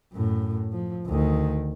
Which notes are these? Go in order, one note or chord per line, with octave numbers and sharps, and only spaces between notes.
F#2 A2
F3
D2 D#3